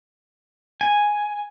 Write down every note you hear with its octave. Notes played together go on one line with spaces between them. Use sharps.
G#5